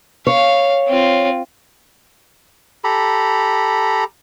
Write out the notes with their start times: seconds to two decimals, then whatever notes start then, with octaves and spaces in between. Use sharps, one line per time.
0.27 C#5 F5
0.88 C4 F4
2.84 G4 A4 A#5 B5